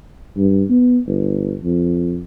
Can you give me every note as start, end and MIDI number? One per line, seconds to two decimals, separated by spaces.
0.37 0.63 43
0.70 1.00 59
1.07 1.56 31
1.63 2.22 41